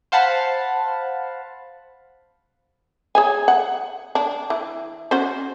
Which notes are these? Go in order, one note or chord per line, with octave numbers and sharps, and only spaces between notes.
C5 F5 F#5 A5 B5
G#4 C#5 G#5
F#5
D4
E3
C#4 F#4 C5